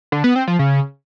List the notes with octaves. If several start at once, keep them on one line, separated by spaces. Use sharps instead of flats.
D3
B3
C4
F3
C#3